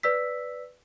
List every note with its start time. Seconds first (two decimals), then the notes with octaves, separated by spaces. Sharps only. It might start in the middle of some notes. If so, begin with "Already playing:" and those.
0.03 B4 D5 E6 B6